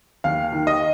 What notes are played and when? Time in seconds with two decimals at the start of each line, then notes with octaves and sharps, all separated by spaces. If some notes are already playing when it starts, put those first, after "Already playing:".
0.24 D#2 F5
0.52 D#3
0.67 D#5